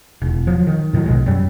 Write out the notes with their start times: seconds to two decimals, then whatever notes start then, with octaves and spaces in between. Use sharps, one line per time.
0.22 E1
0.47 F3 F#3
0.67 D#3
0.93 A2 D#3 E3 F#3
1.06 B1 B2 G#3
1.26 F#2 F#3 G3